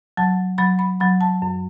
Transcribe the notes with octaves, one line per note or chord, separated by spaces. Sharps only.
F#3 A5
F#3 B5
B5
F#3 B5
A5
F#2